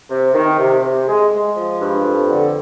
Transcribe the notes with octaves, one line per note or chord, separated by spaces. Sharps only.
C3
D#3
C3
C3
G#3
G#3
F3
G2
F2
D3